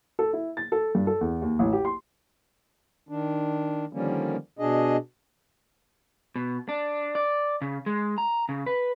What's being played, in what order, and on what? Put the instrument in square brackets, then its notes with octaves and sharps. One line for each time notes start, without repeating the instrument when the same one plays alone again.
[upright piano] A4
E4
A6
A4
G2
A4
E2
D#2
A1
G4
C6
[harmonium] D#3 D4
D3 D#3 F3 G3 A#3 C#4
B2 D4 G#4 D#5
[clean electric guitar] B2
D4
D5
C#3
G#3
A#5
C#3
B4